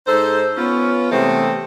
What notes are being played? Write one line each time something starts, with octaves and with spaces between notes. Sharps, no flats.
G#2 D#4 A4 C5
B3 C#4 F4
C3 E3 G#3 A3 B3 C4